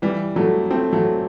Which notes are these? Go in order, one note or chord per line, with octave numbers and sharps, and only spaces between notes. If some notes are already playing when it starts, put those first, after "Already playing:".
E3 G3
F#3 A3
A3 C4
F#3 A3